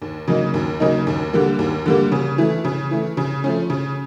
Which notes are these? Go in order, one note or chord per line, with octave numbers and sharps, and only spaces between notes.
D#2
C#3 F#3 A#3 D#4
D#2
C#3 F#3 A#3 D#4
D#2
D3 G3 A#3
D#2
D3 G3 A#3
C#3
E3 A3
C#3
E3 A3
C#3
F3 A3 C#4
C#3